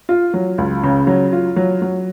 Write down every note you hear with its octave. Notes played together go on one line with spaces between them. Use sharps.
F4
F#3
C#2
C#3
F#3
F4
F#3
F#3